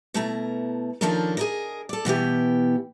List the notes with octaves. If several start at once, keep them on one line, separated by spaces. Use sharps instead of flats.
B2 A3 E4 A#5
D#3 F3 C#4 D4 A4 A#4
G#4 A#4 D#5
A4 D5
B2 E3 B3 G4